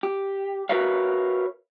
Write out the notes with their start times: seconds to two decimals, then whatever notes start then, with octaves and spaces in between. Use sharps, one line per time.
0.03 G4
0.69 F#4 A#4 B4 C#5 E5 F5